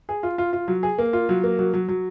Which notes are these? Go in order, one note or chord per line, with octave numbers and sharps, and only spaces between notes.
G#4
F4
F4
F4
F#3
G#4
A#3
F4
F#3
A#3
F#3
F#3
F#3